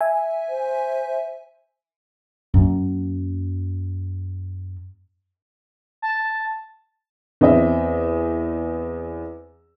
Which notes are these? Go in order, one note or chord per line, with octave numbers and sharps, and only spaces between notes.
E5 G#5
C5
F#2 A#3
A5
E2 C4 D#5 E5